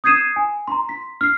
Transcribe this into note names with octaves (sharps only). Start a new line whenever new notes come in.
D#6 G6 G#6 C7 D#7 E7
G#5
A#5 C6
B6
F6 C7